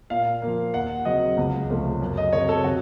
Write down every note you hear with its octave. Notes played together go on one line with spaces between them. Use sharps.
A#2 F5
F3 A#3
D#2 F#5
C#3 F#3 C4 D#5
C#2
C3 F3 A3 C#4
F#2
D#5
C#3 F#3 C4 C#5
A4
C3 F#4